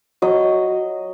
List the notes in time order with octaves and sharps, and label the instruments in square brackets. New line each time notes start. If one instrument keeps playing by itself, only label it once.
[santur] F#3 D#5